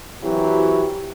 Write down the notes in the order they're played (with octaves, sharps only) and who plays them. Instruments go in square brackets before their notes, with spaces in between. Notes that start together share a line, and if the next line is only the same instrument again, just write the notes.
[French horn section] E3 F#3 C4 E4 F#4 G4